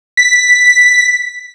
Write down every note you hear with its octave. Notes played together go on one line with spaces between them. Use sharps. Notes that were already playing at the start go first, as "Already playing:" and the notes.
B6